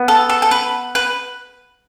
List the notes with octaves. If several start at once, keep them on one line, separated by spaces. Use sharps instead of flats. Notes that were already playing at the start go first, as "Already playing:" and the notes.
Already playing: B3
A4
A4
A4
B4
B4